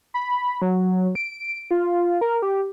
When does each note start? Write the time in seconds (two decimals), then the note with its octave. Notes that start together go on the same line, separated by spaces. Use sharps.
0.14 B5
0.62 F#3
1.15 D7
1.71 F4
2.21 A#4
2.42 G4